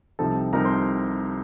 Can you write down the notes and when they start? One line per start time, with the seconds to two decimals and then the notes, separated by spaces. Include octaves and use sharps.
0.19 C2 C3 F3 C4 D#4 A4 A5
0.53 C2 C3 F3 C4 D#4 A#4 A#5
0.65 C5 C6